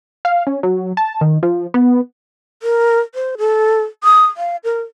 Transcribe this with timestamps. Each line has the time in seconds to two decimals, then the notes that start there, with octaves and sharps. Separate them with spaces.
0.25 F5
0.47 C#4
0.63 F#3
0.97 A5
1.21 D#3
1.43 F3
1.74 B3
2.63 A#4
3.15 C5
3.38 A4
4.04 D#6
4.37 F5
4.64 A#4